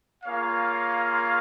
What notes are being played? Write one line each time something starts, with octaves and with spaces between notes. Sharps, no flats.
A#3 F4 G#4 C#5 F5